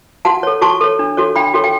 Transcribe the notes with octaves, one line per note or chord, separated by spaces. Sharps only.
F#4 F#5 A5
A4 C#5
F#4 A5 C#6
A4 C#5
D4
F#4 A4 C#5
D4 G5 B5
F#4 A4 C#5
G5